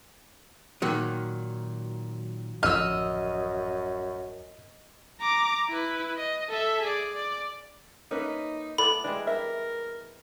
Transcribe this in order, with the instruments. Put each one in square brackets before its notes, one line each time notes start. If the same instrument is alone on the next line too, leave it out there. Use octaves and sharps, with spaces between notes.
[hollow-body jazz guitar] A#2 D#3 F#3
[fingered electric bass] D1 A1 F3 [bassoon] F#2 [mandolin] D#5 E6 [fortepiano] F6
[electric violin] A#5 D6
E4 B4
D#5
A4 E5
G#4 D5
D5
[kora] A#3 B4 E5 [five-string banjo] C#4 [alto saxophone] D#4
[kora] A2 B3 D5 [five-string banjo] A4 [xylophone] B5
[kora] E3 G3 G#3 [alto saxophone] D4
[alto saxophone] A#4 [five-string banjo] E5